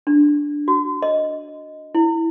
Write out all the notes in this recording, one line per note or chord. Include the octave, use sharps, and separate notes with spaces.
D4
F#4
D#5
E4